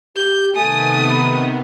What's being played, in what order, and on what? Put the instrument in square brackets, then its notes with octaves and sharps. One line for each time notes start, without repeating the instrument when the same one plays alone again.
[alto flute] G4 [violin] G6
[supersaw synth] C3 D#3 B3 [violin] A3 D#6 [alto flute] G#5
[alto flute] B5